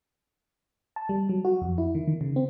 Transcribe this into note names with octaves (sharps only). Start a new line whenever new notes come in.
A5
G3
F#3
F#4
F2
E4
D#3
D#3
C#3
C4